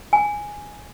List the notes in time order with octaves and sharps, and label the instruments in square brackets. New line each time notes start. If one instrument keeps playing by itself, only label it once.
[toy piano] G#5